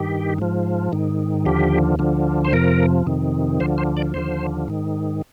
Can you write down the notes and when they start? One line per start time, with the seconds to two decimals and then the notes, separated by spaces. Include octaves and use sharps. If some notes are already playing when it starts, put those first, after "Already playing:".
Already playing: G2 D#3 G4
0.38 G#2 F3
0.92 G#2 D#3
1.45 D#2 D3 F3 G4
1.99 D2 D3 F3
2.45 C5
2.53 F2 C3 F3 A#4
3.07 F2 C3 D#3
3.60 D2 D3 F3 C5
3.78 C5
3.97 D5
4.14 D#2 D3 F3 C5
4.68 G#2 D#3